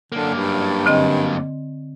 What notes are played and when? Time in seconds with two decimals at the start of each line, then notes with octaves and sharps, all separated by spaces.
0.12 F#2 D3 A#3
0.34 G2
0.86 D3 C4 D#5